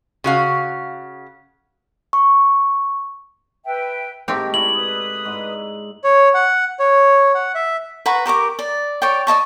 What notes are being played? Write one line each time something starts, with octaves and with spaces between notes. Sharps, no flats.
C#3 F#4 F5
C#6
B4 E5 G5
G#2 A3 C4 G4 A#4
E4 D5 F#7
B4 D#6
G#2
C#5
F#5
C#5
F#5
E5
B4 F#5 A#5 C#6
G4 A#4 C#6 D6
D5
C#5 D5 G5
D5 D#5 A5 C#6